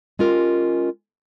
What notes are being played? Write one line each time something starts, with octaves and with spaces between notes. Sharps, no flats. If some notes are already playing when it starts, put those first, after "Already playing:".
G#3 C#4 F4 G4 A#4